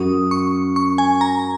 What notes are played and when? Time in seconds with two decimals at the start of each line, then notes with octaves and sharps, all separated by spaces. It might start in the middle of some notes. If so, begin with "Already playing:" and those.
Already playing: F#2 F#3 C#4 F#4 D#6
0.31 C#6
0.76 C#6
0.98 G#5
1.21 A#5